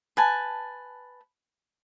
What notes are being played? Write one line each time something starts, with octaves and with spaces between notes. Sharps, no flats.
B4 G#5 A5